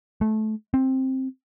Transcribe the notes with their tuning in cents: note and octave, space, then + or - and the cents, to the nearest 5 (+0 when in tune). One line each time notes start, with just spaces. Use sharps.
A3 -20
C4 +10